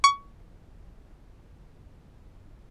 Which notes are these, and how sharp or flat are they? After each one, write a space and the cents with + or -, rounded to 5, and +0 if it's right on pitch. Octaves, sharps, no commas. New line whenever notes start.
C#6 +20